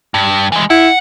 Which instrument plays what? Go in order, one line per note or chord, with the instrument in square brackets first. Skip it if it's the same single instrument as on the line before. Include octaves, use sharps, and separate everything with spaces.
[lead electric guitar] G2
E3 G#3
[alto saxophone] E4 [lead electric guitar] F#5